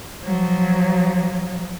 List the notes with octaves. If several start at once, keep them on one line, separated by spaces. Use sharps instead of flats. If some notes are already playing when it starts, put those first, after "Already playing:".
F3 F#3